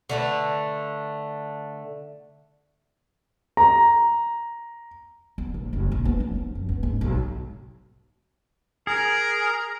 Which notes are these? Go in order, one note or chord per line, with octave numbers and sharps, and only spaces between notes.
D3 A3 B4
A#5
B3
A#1
F#1
A#1
B3
F#3
F3
F#2
B3
G#2
B1
G#4 A#4